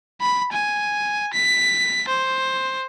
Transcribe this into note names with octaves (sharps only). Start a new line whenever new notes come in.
B5
G#5
B6
C5